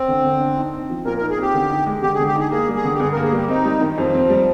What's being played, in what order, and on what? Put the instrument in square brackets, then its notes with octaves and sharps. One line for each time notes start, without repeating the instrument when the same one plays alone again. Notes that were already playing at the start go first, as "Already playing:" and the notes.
Already playing: [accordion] C4
[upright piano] D3
D3
D4
D#4
C4
F3
[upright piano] A#2 [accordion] A#4
[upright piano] D#4 [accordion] A#4
[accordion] G#4
[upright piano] C4 [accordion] G4
[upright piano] D3
D#4
G#3
[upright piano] D3 [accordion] G4
[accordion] G#4
[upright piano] D3
[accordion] G4
[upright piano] D#4 [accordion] G#4
[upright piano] A#3 [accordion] G#4
[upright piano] G3
[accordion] G#4
[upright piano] D3
[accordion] G4
[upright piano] G2 [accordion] G#4
[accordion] A#4
[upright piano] A#3
[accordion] G#4
[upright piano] G3 [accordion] G4
[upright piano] C4 [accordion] D#4
[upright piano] G3
D#3
[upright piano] F2 [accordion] F3
[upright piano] C4
G3